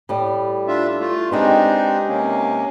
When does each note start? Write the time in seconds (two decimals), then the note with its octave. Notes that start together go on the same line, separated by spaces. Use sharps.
0.09 A2 G3
0.68 D4 F4 E5
1.00 A3 F4
1.31 G#3 C4 D4 D#4 G4 B4
2.08 C3 A#3 C#4